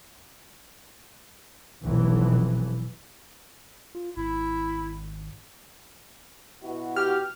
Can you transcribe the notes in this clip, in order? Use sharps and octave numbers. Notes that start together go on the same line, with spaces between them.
F1 B1 F2 E3
F4
G#1 E4
B2 E4 F#4
G4 F6